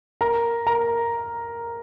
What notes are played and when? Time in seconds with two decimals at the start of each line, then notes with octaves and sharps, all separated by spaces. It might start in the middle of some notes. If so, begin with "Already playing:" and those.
0.21 A#4 A#5
0.67 A#4 A#5